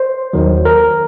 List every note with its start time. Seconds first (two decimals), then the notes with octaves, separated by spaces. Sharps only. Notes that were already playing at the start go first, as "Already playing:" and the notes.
Already playing: C5
0.33 D#2 D#3 F#3
0.65 A#4